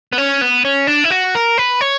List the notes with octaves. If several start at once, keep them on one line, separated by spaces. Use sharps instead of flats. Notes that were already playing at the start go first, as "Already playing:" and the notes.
B3
C#4
B3
C#4
D4
E4
F#4
A#4
B4
C#5